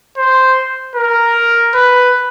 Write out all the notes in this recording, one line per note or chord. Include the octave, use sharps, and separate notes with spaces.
C5
A#4
B4